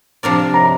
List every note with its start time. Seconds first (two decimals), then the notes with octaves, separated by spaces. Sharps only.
0.23 C3 F3 D4 A#4 D5
0.54 A#5